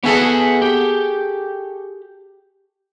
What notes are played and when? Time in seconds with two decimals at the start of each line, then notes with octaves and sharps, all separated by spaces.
0.04 B3 F#4 G#4 A4 E5 F#5
0.62 G4